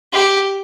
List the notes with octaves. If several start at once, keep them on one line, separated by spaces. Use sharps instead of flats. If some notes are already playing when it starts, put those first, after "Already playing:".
G4